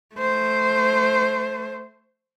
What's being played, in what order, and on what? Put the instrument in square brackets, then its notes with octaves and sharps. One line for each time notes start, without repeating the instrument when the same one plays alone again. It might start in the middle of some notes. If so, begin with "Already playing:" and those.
[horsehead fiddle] A3 C5